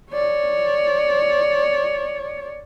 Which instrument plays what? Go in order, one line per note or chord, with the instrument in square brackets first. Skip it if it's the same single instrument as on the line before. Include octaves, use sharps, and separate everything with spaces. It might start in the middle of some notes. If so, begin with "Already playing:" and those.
[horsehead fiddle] C#5 D5